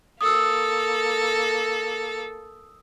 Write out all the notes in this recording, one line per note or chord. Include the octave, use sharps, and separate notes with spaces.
A#3 A4 D#6 E6